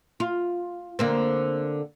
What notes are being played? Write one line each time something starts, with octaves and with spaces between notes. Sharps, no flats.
F4
D3 A#3 C4